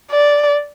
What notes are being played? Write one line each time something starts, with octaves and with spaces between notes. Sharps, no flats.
D5